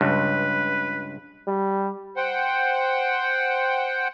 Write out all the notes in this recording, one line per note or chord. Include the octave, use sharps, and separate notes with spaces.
C#2 G2 B4
G3
C5 F#5 G5